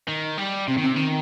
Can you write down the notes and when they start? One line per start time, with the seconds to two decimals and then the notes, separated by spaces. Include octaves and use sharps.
0.08 D#3
0.38 G3
0.68 C3 C4
0.78 D#3
0.82 C3 C4
0.96 D#3 C4